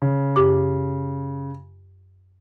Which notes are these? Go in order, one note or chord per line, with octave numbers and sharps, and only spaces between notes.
C#3
F#2 G4 D6